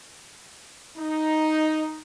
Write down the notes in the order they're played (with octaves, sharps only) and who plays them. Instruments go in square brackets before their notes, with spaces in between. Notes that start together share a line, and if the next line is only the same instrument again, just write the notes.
[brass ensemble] D#4